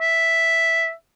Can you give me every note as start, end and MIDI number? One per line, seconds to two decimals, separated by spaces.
0.01 0.92 76